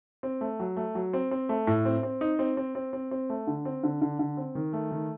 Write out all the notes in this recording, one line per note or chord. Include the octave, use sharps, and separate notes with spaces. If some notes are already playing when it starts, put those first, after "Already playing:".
C4
A3
F#3
A3
F#3
C4
C4
A3
A2
C4
C4
D#4
C4
C4
C4
C4
C4
A3
D3
C4
D3
D3
D3
C4
D#3
A3
D#3